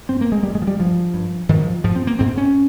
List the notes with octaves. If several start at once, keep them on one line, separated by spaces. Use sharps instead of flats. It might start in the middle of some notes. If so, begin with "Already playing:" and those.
G2 C4
A#3
G#3
G2 G3
G#3
F3
G3
G2 F3
G2
G#2 D#3
F3
G#2 F3
C4
A#3
G#2 C4
C#4